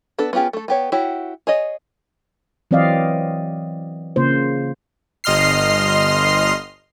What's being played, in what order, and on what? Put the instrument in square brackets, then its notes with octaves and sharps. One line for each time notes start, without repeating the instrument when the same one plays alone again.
[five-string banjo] B3 D4 A4 B4
B3 C#4 F4 G4 G#4
A3 A4
B3 G4 C#5
E4 F#4 G4 C#5
G#4 C#5 D#5
[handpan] E3 F#3 C4 D5 D#5 F5
C#3 A#3 F4 C5
[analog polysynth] G1 D#5 C6 F6 C7